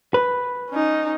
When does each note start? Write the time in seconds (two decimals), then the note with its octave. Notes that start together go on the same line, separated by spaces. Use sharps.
0.14 B4
0.70 C#4 D#4